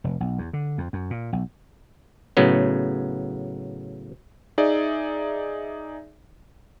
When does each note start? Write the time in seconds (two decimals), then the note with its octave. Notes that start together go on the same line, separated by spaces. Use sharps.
0.04 F1
0.20 B1
0.38 E2
0.53 D3
0.78 F2
0.93 F#2
1.10 A#2
1.33 B1
2.37 A2 C#3 F#3 B3
4.58 D#4 G#4 D5 E5